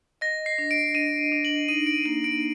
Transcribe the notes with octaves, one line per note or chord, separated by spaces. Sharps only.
D#5 A#6
C7
D4
D7
D4 D#7
D4
F#7
D#4 D#7
D7
A#3 D#7
D7